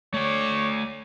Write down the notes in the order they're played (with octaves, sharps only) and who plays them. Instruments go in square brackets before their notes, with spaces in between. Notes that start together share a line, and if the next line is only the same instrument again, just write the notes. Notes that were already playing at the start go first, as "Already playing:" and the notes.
[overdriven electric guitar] A3 D5 [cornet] C#5